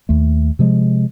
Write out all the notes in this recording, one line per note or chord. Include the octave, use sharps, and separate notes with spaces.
D#2 A3
C3 F3 G#3